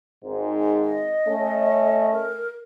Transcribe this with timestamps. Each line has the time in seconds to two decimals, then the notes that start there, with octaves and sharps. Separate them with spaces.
0.23 G#1 G#2
0.83 D#5
1.26 A3 C#4
2.12 A#4